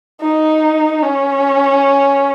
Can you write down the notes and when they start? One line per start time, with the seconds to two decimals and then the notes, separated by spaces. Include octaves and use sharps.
0.21 D#4
1.03 C#4